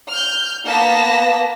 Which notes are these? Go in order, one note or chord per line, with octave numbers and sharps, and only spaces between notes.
F6 G6
A#3 B3 A5 A#6 B6